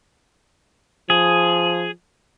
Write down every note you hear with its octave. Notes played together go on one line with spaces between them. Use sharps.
F3 G#4